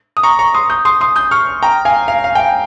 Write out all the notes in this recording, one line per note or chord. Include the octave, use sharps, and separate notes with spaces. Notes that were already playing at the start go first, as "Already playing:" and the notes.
D#6
A#5 C#6
A#5 C#6
C6 D#6
D#6 G6
C6 D#6
C6 D#6
D#6 G6
C#6 F6
G5 A#5
F5 G#5
F5
F5
G5
F5